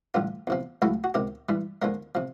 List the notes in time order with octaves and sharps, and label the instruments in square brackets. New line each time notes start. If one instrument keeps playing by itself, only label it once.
[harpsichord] A1 G2 D3 F4
E2 C3 F3
C#2 C#3 F#3 A3 E4
F#4
C#2 C3 D#3 G4
G2 E3 G3
D#2 D3 F3 G#3 A#4
C3 F3